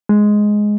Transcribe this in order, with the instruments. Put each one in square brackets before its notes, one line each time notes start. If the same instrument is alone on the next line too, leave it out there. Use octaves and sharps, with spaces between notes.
[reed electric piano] G#3